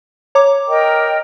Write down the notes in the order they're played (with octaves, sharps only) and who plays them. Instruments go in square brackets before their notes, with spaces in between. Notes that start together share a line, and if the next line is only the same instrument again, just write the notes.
[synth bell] C#5 A#5 D6
[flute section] A#4 D#5 G5